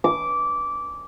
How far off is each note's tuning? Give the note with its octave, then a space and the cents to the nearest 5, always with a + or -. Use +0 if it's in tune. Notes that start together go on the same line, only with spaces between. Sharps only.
D6 -15